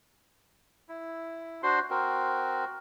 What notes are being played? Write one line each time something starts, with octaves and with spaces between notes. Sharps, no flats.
E4
D4 F#4 C5 C6
C4 F#4 A#4